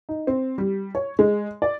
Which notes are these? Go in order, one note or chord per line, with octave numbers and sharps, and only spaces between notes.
D#4
C4
G3
C#5
G#3
D5